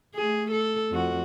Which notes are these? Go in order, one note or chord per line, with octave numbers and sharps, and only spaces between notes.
A3 G#4
A4
F2 F#4